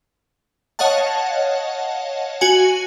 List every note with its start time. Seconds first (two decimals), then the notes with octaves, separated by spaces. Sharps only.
0.79 C#5 D#5 F5 F#5 A5
2.41 F#4 G#5